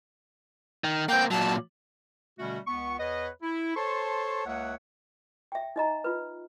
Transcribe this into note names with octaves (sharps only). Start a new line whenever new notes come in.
D#3
A#3 C4 G5
A#2 F#3 A5
B2 D3 G3 A3 C#4 F#4
C#2 B3 C#6
E2 B4 C#5 D#5
E4
A4 C5 C#5 A5 C6 C#6
C#2 A#3 C#5 E5 F#5
E5 G5
D#4 D#5 A#5
F4 B4